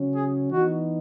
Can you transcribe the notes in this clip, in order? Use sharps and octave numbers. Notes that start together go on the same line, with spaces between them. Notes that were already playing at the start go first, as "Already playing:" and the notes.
Already playing: C#3 F#3 C#4
G#4
E3 B3 D#4 F#4